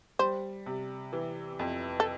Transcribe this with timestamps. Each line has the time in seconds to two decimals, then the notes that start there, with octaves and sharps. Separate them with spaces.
0.19 G3 C5
0.66 C3
1.13 E3
1.59 F2
2.00 A4